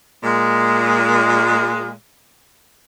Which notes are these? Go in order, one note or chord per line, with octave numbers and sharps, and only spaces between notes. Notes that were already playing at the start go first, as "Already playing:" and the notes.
A#2 G#3